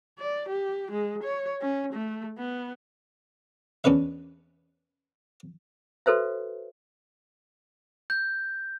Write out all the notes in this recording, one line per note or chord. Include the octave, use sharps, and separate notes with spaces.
D5
G4
G#3
C#5
C#4
A3
B3
E2 C#4 D4 B4 E5
F#4 A4 B4 C5 E5
G6